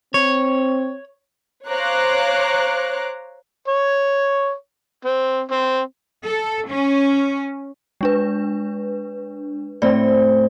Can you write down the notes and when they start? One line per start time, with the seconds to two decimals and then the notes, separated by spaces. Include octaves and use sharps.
0.14 C4 C#5
1.69 C5 C#5 F5 A#5 D6 F#6
3.68 C#5
5.05 C4
5.51 C4
6.24 A4
6.68 C#4
8.01 G#3 D4 B4
9.82 A2 C4 D5